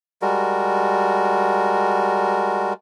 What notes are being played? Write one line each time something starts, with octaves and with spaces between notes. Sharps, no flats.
G3 G#3 F#4 A#4